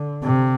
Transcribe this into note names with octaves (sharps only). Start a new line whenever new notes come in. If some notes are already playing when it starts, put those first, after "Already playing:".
Already playing: D3
C3